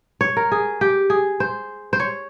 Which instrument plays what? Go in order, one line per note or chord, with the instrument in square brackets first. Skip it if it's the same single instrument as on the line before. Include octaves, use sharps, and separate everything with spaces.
[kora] C#5
A#4
G#4
G4
G#4
C5
C5
C#5